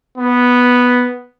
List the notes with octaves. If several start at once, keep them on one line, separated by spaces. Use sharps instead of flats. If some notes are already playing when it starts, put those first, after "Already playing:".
B3